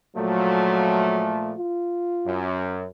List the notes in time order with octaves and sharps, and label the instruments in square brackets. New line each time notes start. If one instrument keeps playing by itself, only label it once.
[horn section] A#2 F3 A3 [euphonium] F#3
[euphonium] F4
[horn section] F#2